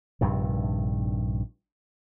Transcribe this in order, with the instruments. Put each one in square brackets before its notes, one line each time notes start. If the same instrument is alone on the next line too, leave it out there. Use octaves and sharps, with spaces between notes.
[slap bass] A#1 G2 C3 D#3